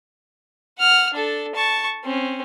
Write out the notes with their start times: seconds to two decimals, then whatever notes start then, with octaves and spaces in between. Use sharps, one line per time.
0.79 F#5 F6
1.13 D4 A4
1.55 A5 C#6
2.04 C4 C#4